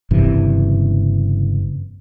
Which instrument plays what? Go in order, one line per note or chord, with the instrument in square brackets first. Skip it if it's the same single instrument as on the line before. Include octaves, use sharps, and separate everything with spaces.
[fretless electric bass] F#1 G2 C3 E3